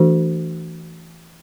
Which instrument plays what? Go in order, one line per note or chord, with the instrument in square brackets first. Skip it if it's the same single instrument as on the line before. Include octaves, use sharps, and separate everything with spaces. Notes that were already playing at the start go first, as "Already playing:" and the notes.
Already playing: [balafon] E3 A3 D4 F#4 A4